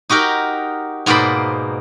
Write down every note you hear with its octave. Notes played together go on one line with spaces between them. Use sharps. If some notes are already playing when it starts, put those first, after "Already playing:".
D#4 F#4 G4 A#4
G#2 B2 A#3 C5 D5 B5